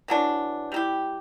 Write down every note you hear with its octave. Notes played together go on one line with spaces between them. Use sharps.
E3 F#3 D4
G3 E4 G4